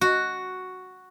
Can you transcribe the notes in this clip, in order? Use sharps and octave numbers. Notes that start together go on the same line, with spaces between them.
F#4